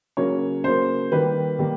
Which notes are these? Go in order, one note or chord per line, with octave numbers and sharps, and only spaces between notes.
C#3 F#3 A#3 C#5
C#3 F#3 A#3 C5
D#3 G3 A#3 B4
D#3 G3 A#3